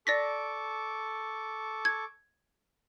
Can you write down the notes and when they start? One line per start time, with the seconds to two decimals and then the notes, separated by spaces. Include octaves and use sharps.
0.07 A4 D5 C#6 D6 A#6 B6
1.85 G#6